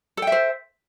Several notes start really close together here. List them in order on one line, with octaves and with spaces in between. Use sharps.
A4 G5 E5 C5